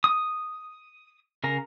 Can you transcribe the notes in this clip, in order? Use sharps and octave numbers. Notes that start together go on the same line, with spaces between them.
D#6
C#3 A#4 A#5